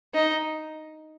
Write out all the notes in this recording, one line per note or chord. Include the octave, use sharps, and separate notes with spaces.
D#4